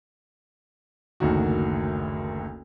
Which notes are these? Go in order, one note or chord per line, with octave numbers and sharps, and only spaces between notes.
F#1 D2 D#3 F#4